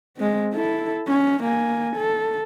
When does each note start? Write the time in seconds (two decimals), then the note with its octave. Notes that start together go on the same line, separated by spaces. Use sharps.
0.17 G#3 C4
0.54 E4 A4
1.08 C#4
1.43 A#3 G#5
1.96 A4